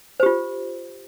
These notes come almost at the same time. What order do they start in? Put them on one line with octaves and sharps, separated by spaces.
C5 G4 F4